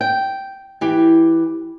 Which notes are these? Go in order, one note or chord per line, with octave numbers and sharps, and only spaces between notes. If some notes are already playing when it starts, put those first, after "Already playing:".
G5
E3 G4